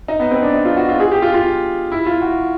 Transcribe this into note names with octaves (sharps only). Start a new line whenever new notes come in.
D#4
B3
C4
D4
D#4
F4
F#4
F4
G#4
G4
F4
F4
E4
F4
F#4